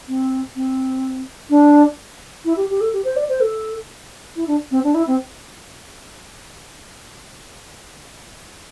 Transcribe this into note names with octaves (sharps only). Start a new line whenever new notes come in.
C4
C4
D4
E4
G4
G4
A4
G4
C5
D5
C5
A4
E4
D4
C4
D4
E4
C4